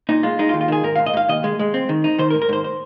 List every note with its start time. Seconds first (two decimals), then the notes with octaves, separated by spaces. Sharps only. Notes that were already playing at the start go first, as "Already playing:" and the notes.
0.09 A#2 D#4
0.23 G#3 F4
0.39 G#3 D#4
0.49 F4
0.54 D#2
0.61 F4
0.68 D#3 G#4
0.83 G#2 A#4
0.96 G#2 F5
1.06 D#5
1.13 G#2 F5
1.28 D#2 D#5
1.44 G#3
1.59 G#3
1.74 C4
1.89 D#3
2.04 D#4
2.18 D#3 C5
2.30 A#4
2.34 G#2
2.42 A#4
2.49 G#2 C5
2.64 C5